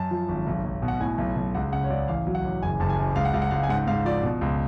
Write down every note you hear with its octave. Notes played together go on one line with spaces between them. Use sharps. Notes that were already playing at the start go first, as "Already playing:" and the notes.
Already playing: F#2 A5
F3
G#1
B1
B1
B2
F#5
A2 G#5
B1
B1
C#2 F#5
C#3 F#5
C#5
C#2 D5
A1 F5
F#3
F#5
A1
F#1 G#5
F#1 A5
G#5
F#2
C#2 F5
F#5
C#2 F5
F#5
C#2 F5
G#5
G#2 F#5
G#2 F5
F3 D5
B2
C#2